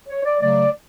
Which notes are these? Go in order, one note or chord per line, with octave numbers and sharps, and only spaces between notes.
C#5
D5
C#3 F#3 A3 D5